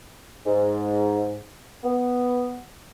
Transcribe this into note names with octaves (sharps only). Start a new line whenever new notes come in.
G#2
B3